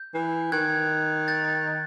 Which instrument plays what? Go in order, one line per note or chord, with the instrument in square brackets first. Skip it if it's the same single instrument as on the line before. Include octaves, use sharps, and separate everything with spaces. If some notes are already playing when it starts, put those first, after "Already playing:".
Already playing: [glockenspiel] G6
[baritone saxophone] E3
[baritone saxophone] D#3 [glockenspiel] F#6 G#6
[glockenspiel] G6 A6